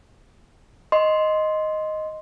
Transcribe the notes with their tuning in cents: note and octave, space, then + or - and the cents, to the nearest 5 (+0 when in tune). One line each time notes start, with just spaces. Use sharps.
D#5 +0 C6 +0